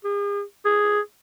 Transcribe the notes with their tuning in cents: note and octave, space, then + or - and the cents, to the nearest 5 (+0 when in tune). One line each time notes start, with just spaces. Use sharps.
G#4 -40
G#4 +0